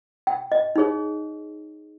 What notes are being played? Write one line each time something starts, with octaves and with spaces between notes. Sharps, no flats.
G5
D#5
D#4 G#4 C#5